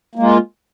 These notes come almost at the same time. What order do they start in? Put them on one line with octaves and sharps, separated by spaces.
A#3 G#3 F4